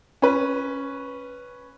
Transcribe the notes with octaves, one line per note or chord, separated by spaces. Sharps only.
C#4 B4